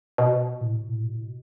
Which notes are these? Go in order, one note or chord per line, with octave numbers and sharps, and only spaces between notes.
B2
A2
B2
A2
B2
A2
B2